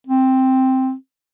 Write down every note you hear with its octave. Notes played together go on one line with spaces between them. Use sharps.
C4